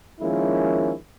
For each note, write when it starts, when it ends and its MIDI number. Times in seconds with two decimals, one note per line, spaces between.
0.21 0.94 51
0.21 0.94 53
0.21 0.94 56
0.21 0.94 58
0.21 0.94 61
0.21 0.94 64